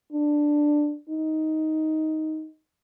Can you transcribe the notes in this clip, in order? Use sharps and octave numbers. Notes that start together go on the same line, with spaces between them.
D4
D#4